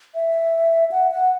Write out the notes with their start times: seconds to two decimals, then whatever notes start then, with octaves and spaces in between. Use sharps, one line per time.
0.15 E5
0.91 F#5
1.11 F#5